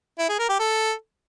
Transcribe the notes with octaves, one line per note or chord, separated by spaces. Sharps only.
E4
G#4
A#4
G4
A4